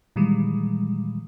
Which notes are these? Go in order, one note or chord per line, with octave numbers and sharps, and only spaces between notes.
A#2 D#3 E3 G3 G#3